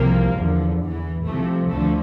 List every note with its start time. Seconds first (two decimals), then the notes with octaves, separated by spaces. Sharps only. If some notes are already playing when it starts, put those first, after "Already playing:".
Already playing: C2 C3 F3 A#3
0.35 E2 D3 F3
0.80 E2 E3
1.26 C2 C3 F3 A3
1.70 D2 D3 F3 A3